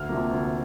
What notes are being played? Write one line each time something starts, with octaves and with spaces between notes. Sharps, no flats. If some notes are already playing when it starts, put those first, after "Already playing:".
Already playing: D2 F6
C3 F3 A#3
D2